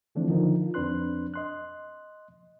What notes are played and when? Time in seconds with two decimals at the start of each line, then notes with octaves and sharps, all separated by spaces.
0.15 D3 E3 F3 A3 C4 D4
0.28 D3 D#3 F3 D#4 A#4
0.61 F4
0.74 F2 C4 D4 B4 C6 F#6
1.34 D#5 C6 F#6